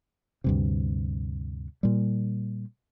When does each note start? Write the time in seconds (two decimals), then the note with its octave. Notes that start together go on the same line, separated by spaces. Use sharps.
0.44 D2 G2 C3
1.83 A#2 G3